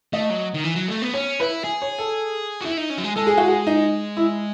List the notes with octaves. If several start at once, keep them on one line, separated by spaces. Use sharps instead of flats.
A3 D#5
F#3
D#3
E3
F#3
A3
B3
C#4 C#5
E4 B4
G#4
C#5
A4
F#4
E4
D#4
C#4
F#3
G#3
G#3 A4
G#4
F#4
G#4
D#4
E4